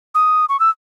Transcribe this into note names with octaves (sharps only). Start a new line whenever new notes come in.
D#6
C#6
E6